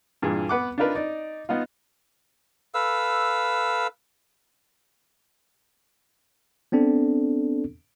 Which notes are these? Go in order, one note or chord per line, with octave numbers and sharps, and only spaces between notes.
G2 A#2 E3 G#4
B3 B4 F#5 D6
D4 D#4 F4 A#4 B4
D#4 D5
B3 D#4 F4
A4 B4 F5 E6
B3 C4 D4 A4